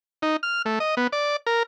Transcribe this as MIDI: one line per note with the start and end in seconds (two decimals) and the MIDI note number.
0.22 0.37 63
0.43 0.62 89
0.66 0.79 57
0.80 0.95 75
0.97 1.07 59
1.13 1.36 74
1.47 1.63 70